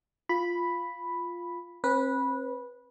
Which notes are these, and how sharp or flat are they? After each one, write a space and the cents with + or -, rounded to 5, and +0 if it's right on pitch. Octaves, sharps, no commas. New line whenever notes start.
F4 +0 B5 +0
C4 +40 B4 -15